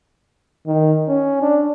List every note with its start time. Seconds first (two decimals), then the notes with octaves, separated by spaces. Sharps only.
0.66 D#3
1.08 C#4
1.42 D4